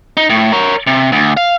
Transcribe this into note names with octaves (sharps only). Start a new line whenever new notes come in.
D#4
A2
A#4 C#5
C3
D2
F5